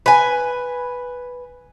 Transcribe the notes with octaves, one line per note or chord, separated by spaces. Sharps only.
B4 G#5